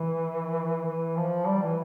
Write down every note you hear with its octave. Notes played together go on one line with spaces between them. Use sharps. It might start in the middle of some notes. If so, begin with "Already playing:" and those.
Already playing: E3
E3
F3
G3
E3